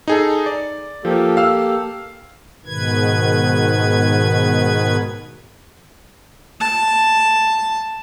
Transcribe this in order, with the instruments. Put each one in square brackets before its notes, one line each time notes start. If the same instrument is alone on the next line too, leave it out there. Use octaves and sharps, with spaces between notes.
[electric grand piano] D#4 G#4 A4
D5
[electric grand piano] F3 [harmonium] A#3 G4 A4
[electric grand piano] F5 E6 F6
[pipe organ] G#2 B2 D#3 B4 G#6
[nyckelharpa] A5